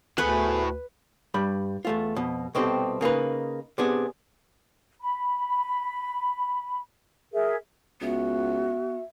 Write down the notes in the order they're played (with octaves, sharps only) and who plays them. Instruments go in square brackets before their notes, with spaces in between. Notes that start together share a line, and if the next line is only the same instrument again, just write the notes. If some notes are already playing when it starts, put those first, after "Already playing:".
[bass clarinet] D2 [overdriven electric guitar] A2 B5 [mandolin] A3 B3 G#4 [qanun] B4
[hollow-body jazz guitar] G2 G3 B5
E2 A3 F4
F2 B2
C2 B2 C4 G4 A4
C#3 A#3 D#4 B4
C3 B3 D4 G#4
[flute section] B5
G#4 A#4 E5
[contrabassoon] C#2 [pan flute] B3 [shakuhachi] F#4 [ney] E5